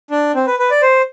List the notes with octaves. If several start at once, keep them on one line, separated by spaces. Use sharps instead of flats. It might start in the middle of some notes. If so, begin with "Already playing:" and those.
D4
C4
B4
B4
D5
C5